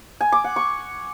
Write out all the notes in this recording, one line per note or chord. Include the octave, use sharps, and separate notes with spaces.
G#5
D6
F#5
C#6